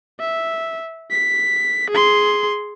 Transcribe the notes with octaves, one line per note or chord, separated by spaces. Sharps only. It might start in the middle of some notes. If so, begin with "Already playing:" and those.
E5
B6
G#4 C6